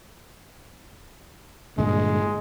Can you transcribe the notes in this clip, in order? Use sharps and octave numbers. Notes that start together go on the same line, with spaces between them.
G2 A#2 D3 G#3